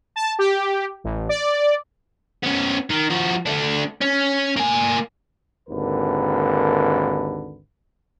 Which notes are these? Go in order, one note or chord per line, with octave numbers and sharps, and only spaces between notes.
A5
G4
A1
D5
B3 C#4
D#3
F3 F#4
A3 D4
C#4
A#3 G#5
G#1 D#2 D3 A#4 B4